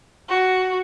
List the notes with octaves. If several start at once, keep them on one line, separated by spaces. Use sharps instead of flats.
F#4